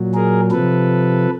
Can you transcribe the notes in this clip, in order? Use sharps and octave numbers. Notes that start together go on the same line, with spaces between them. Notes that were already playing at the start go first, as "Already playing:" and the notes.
Already playing: A#2 F#3
G#4 A#4
C3 F3 A4 B4